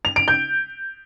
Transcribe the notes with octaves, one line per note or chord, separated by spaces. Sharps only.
F7
D7
G6